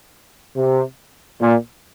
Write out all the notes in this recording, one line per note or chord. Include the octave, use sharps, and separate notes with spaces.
C3
A#2